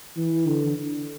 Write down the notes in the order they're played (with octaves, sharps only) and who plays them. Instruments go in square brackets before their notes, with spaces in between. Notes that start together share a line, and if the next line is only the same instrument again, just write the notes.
[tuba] E3
D3